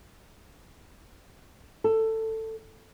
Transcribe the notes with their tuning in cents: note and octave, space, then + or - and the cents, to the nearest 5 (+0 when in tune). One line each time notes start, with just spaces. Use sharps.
A4 +15